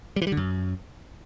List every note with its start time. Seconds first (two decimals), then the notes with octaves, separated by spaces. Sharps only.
0.16 G3
0.22 E3
0.27 G3
0.32 D3
0.37 F#2